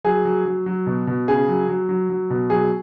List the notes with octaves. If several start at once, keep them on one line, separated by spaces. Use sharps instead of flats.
F#3 G#4
F#3
F#3
F#3
B2
B2
C#3 G#4
F#3
F#3
F#3
F#3
B2
F#3 G#4